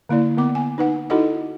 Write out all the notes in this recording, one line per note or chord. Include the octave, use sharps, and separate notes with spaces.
D3 A#3 E4 D5
D3 B3 D6
G#5
D#4 B4 F#5
D#4 E4 F#4 A4 D#5 F#5